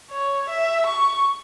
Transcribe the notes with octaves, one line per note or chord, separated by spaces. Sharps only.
C#5
E5
C#6